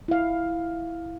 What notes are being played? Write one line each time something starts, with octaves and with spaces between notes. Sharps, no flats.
E4 F5